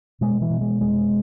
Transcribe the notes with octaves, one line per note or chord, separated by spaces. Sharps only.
B2 G#3
E3
B2
G#3
F1 G#3